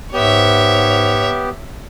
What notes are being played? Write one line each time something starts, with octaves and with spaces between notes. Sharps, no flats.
G#2 B3 G4 C#5 E5